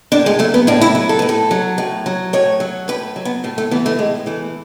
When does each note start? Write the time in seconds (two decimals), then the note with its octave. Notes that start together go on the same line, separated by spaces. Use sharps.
0.12 A2 D4
0.26 G#3
0.39 F#3 A3
0.54 B3
0.67 A2 D4
0.81 E4
0.95 F#3
1.09 A4
1.19 A2 B4
1.29 A4
1.51 F#3
1.78 A2
2.06 F#3
2.33 A2 C#5
2.60 F#3
2.88 A2 B4
3.16 F#3
3.25 B3
3.44 A2 A3
3.58 A3
3.71 E3 B3
3.86 A3
3.98 A2 G#3
4.26 E3 A3